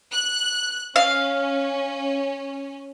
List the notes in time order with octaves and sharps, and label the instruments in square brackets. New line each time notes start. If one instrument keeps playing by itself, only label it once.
[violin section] F#6
[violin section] C#4 [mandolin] F5